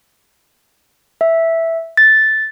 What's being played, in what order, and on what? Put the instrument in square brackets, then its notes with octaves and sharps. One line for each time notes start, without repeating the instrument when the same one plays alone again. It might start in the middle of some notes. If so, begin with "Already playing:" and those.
[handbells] E5
A6